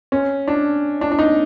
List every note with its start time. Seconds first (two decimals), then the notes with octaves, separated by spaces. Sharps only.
0.12 C#4
0.48 D4
1.01 D4
1.12 D4
1.19 D#4